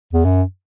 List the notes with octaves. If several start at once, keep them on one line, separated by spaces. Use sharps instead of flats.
E2
F#2